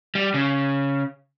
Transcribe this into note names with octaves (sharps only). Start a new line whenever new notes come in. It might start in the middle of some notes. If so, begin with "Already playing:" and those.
G3
C#3